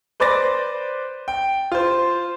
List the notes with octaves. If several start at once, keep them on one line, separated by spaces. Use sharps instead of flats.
B4 C5 D5 D6 A6 A#6
G5
F4 C5